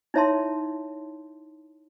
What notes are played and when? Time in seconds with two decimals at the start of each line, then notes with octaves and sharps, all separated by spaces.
0.14 D#4 E4 C#5 E5 A5 C6